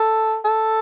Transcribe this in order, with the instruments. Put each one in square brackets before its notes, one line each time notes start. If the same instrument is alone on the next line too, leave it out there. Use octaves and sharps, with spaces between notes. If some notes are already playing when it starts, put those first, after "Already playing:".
Already playing: [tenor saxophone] A4
A4